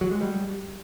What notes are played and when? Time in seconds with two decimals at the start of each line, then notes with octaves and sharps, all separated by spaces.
0.01 F#3
0.11 G#3
0.21 G3